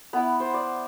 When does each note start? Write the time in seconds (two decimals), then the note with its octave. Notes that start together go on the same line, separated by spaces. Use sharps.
0.13 B3 E4 B5
0.40 C5
0.54 D5